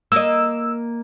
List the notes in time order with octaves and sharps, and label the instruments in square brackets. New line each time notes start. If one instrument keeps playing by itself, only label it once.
[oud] A#3 D#5 [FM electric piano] E6